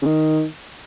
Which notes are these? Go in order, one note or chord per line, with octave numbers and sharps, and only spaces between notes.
C#3
D#3